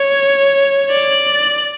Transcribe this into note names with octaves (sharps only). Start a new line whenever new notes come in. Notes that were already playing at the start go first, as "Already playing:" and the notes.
Already playing: C#5
D5